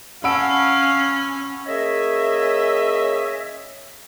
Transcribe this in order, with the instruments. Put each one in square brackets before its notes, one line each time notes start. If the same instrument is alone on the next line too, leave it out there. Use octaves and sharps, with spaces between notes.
[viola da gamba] C#4 [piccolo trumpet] F5 [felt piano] F#5 A5 [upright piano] B5 E6 D7
[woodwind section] A#3 C#4 G#4 C#5 D#5 E5